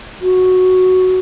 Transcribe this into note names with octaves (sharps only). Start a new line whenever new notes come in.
F#4